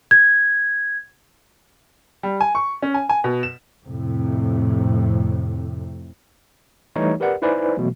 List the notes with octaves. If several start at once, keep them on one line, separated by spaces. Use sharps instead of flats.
G#6
G3
G#5
C#6
C#4
G#5
G#5
B2
E7
F2 A2 C3
E3 G3 A3 D#4 C#5
G4 A#4 B4 D5 F#5
D#4 E4 B4 C5 D5 G#5
B2 E3 F#3 A3